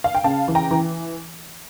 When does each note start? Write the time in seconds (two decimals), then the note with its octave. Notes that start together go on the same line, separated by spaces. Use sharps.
0.04 F5
0.15 G5
0.24 C#3 F5 A5
0.48 E3
0.55 G5 A#5
0.71 E3